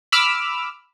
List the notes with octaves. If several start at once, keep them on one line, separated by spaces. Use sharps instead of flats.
B5 D6 E6 F6